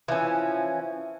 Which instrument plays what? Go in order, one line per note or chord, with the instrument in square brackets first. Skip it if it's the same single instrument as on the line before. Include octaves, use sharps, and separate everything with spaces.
[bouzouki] E3 F3 C#4